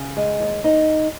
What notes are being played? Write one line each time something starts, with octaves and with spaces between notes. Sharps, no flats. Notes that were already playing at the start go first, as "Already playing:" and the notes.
Already playing: C#3
G#3
D#2
D#4